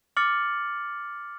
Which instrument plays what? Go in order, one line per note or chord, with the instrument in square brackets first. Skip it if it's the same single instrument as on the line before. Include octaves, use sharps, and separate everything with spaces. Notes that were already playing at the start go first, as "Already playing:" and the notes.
[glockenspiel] D6 F6 A6 C#7 F#7